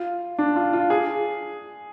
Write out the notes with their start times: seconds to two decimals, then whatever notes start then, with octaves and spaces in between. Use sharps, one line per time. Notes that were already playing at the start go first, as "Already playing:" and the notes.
Already playing: F4
0.38 D4
0.56 F4
0.73 F4
0.90 G#4